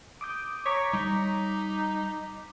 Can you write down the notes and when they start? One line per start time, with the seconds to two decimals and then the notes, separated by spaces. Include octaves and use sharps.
0.21 D6 D#6 G6
0.66 C#5 A#5 D6 B6
0.93 G3 D#4